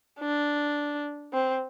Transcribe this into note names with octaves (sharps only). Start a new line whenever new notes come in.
D4
C4